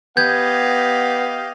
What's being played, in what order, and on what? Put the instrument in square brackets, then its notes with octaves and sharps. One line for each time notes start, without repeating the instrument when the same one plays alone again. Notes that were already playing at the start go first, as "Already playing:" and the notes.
[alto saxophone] B3 [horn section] G4 D#5 F5 [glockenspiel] G6 G#6